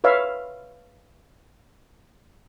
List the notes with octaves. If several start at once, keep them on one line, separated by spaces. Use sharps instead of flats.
B4 C#5 E5 F5